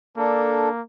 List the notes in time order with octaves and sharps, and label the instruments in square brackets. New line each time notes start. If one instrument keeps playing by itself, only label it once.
[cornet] A#3 [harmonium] D4 A4